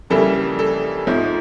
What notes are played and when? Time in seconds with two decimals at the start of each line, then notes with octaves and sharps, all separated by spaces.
0.10 F2 C#3 E3 G3 A#3 A4
0.59 A4
1.07 G#2 F3 A3